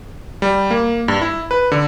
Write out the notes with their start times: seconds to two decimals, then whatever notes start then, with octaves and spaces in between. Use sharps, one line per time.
0.42 G3
0.71 A#3
1.08 G2
1.22 E4
1.51 B4
1.72 D3